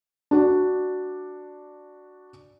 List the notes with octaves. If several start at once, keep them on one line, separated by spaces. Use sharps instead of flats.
D4 F#4 D5